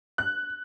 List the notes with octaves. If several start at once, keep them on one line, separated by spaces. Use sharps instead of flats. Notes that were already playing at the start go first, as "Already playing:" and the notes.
F#6